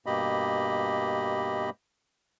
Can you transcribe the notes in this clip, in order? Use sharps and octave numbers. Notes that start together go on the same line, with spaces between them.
G2 B2 A#3 G4 D#5 B5